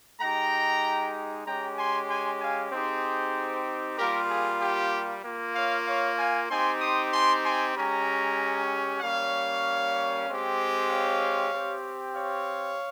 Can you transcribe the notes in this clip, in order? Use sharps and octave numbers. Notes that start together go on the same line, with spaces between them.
G#3 D#4 G4 G5 A#5
G#3 C#4 G4 G5 A#5
G#5 C6
G#5 C6
F5 G#5
C4 D#4 G4 G#4 C5
G3 A#3 F4 G4 A#4
G#4
G4
A#3 F4
C#5 F5
C#5 F5
F5 G#5
C4 D#4 G4 G#5 C6
C6 D#6
G#5 C6
G#5 C6
G#3 C#4 G4 G5 A#5
G3 A#3 C#4 C#5 F5
G#3 C4 G4
C#5 F5
C4 G4
C#5 F5